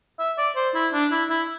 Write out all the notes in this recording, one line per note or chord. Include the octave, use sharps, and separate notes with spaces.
E5
D5
C5
E4
D4
E4
E4